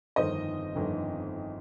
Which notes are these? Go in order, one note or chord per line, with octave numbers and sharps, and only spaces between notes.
G1 F2 D#3 C5 D#5
G1 F2 D#3